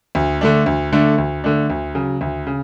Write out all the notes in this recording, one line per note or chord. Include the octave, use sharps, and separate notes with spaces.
D2
D3 A3 D4
D2
D3 A3 D4
D2
D3 A3 D4
D2
C#3 F#3
D2
C#3